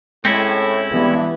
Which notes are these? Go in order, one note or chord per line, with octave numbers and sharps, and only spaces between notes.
A2 G#3 C4 C#4 E4
G2 E3 B3